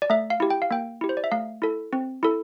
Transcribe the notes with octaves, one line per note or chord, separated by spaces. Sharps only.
D5
A3 E5
F5
E4 G4
G5
F5
A#3 G5
E4 G4
C5
D5
E5
A3 F5
E4 A4
C4
E4 A4